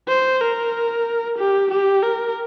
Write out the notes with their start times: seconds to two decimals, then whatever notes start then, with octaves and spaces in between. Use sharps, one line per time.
0.09 C5
0.41 A#4
1.38 G4
1.71 G4
2.03 A#4